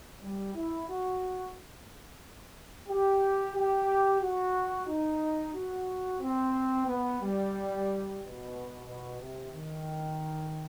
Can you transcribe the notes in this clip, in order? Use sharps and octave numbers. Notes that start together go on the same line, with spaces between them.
G3
E4
F#4
G4
G4
F#4
D#4
F#4
C4
B3
G3
B2
B2
C3
D#3